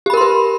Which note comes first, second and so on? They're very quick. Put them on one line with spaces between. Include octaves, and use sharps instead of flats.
G4 B5 A#4 C6 B4